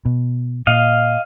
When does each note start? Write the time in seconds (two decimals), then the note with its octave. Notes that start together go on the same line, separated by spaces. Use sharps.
0.05 B2
0.67 A#2 D#5 F5